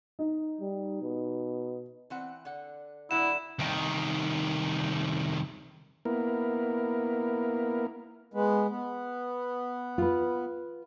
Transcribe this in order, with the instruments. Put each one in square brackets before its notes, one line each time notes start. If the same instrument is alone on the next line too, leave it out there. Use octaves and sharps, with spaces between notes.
[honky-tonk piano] D#4
[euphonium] G3
B2
[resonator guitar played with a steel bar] E3 C4 F#5
D3 F#5
[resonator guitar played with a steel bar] D3 F#3 F#5 [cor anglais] E4 [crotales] E7
[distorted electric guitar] C2 D#3
[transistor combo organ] A#3 B3 E4 A#4
[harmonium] G#3 B3
B3
[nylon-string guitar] F4 B4